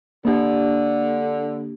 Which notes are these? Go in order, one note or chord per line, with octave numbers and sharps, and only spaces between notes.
D3 A#3 D4 G4